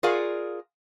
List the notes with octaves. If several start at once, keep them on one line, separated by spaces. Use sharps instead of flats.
F4 G#4 A#4 D5 F5 F#5